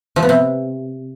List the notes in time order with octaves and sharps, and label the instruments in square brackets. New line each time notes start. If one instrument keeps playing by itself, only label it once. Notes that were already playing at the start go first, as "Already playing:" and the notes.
[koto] F3
B3
C3